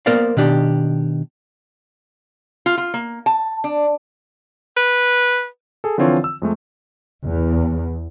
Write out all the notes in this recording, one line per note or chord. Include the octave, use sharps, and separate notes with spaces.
A#3 B3 A#4 C5 D5 F5
B2 D#3 D4 G4
F4
F4
A#3
A5
D4
B4
G#4 A4
D3 E3 F3 C4 F4 C#5
E6
F2 G#3 A3
E2